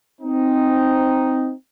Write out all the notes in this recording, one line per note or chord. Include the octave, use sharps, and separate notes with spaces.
C4 D#4